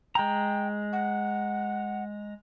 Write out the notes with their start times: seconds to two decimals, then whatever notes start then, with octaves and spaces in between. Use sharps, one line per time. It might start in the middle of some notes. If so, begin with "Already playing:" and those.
0.15 G#3 G5 A#5
0.93 F#5